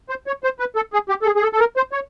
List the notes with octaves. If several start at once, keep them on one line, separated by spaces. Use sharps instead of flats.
C5
C#5
C5
B4
A4
G#4
G4
A4
G#4
G#4
A4
A4
A#4
C5
C#5